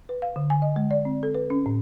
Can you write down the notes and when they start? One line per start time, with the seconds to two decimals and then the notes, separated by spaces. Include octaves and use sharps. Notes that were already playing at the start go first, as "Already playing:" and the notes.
0.09 B4
0.22 F5
0.36 D3
0.50 G#5
0.62 D#5
0.76 G#3
0.91 D5
1.05 C4
1.23 A4
1.35 B4
1.50 C#4
1.66 A2